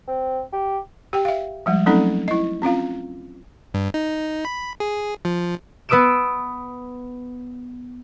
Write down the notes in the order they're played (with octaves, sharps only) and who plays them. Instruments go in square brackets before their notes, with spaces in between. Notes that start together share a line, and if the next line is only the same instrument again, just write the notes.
[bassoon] C4
G4
[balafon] G4 G5
E5 F5
F3 G3 G#3
F#3 A3 C4 C#4 D#4 A4
E4 D#5
C4 C#4 F4 F5
[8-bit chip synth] G2
D#4
B5
G#4
F3
[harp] B3 B4 D#6 E6 D7 E7